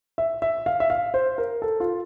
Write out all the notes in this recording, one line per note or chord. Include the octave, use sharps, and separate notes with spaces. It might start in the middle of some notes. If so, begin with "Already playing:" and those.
E5
E5
F5
E5
F5
C5
A#4
A4
F4